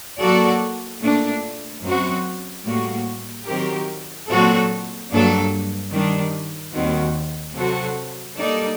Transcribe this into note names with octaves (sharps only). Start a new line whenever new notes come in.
F#3 A#3 F#4 A4 D5
A#2 A3 D4
F#2 F#3 C4 F#4
A2 G3 A#3 F#4
D#3 F#3 C4 G4 A#4
A#2 F#3 C4 F#4 A4
G2 F#3 A#3 D4 A4
D#3 G3 D4
D#2 D#3 G3 C4 F#4
C3 F#3 C4 F#4 A4
G3 A#3 D#4 A4 D5